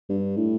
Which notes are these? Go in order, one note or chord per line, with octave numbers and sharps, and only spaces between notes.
G2
A2